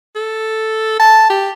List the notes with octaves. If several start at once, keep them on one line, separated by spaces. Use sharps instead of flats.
A4
A5
G4